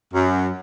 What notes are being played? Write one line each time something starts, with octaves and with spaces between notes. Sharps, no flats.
F#2